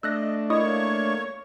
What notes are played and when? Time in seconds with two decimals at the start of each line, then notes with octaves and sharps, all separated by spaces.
0.03 A3 D4 D#5 E6 F#6 A#6
0.50 A#3 E4 C#5 D#5 C#6 D#6